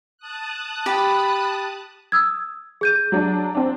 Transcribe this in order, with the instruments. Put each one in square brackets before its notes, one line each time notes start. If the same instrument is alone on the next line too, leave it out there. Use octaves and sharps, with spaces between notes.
[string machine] A5 D#6 F#6
[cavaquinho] G4 [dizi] B5
[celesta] D#6 E6 G#6
G#4 G6 D#7
[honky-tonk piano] F#3 D4
C4 D4